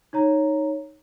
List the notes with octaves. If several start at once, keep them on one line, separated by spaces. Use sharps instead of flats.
D#4 C#5 A#5